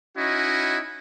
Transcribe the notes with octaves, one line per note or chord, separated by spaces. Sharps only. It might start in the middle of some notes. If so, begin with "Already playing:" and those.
C#4 D#4 E4 F#4 D#5